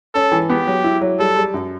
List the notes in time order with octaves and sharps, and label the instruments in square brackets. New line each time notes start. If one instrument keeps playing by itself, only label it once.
[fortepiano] C#4 [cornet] A4
[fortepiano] E3
[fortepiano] B3 [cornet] G4
[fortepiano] F#3
E4
F#3
[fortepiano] G3 [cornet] A4
[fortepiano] G3
F#2